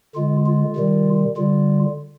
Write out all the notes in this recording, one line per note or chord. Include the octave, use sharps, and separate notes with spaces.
D3 G#3 F4
F4
C3 D#3 G3
D3 G3 F4